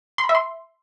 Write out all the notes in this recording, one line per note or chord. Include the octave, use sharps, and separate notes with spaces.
C6
B5
E5
C6